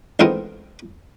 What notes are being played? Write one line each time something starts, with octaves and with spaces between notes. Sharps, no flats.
A1 G#2 B3 C4 F4 D#5